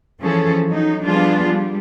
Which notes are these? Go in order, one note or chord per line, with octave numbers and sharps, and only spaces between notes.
E3 F3 C#4 G#4 A4
F#3 D#4
F3 G3 B3 D4 F4 G#4
G3